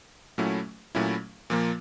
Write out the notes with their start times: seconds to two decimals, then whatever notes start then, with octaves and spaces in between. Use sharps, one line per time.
0.38 A#2 F#3 A3 C#4 E4
0.95 A#2 F#3 A3 C#4 E4
1.50 A#2 F3 A#3